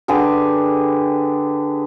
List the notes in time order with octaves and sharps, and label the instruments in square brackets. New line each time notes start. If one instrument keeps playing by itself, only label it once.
[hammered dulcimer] D3 G4 G#4 B4